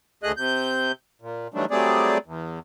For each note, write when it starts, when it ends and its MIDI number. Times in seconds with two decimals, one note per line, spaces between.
0.23 0.32 38
0.23 0.32 57
0.23 0.32 68
0.23 0.32 75
0.23 0.32 90
0.37 0.92 48
0.37 0.92 91
1.22 1.48 46
1.54 1.65 51
1.54 1.65 52
1.54 1.65 54
1.54 1.65 55
1.54 1.65 57
1.54 1.65 62
1.71 2.18 54
1.71 2.18 55
1.71 2.18 57
1.71 2.18 60
1.71 2.18 68
1.71 2.18 74
2.26 2.59 40